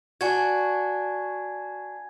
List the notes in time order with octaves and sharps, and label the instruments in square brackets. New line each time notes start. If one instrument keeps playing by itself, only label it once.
[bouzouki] D4 F#4 [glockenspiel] G#5 G#6